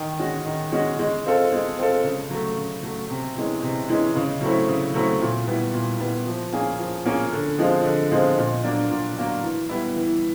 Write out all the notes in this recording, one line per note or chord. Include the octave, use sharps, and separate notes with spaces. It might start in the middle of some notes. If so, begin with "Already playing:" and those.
Already playing: D#3
G#3 C#4 F#4
D#3
G#3 C#4 F#4
G#3
C4 F4 A4
G#3
C4 F4 A4
C#3
F#3 A3
C#3
F#3 A3
C3
E3 G#3 C#4
C3
E3 G#3 C#4
C#3
F#3 A3 C4 E4
C#3
F#3 A3 C4 E4
A#2
G3 B3 E4
A#2
G3 B3 E4
F3
A#3 C#4 F4 G#4
F3
A#3 C#4 F4 G#4
D3
F3 G#3 C4 F4
D3
F3 G#3 C4 F4
A#2
F#3 A#3 D4
A#2
F#3 A#3 D4
E3
G3 B3 E4
E3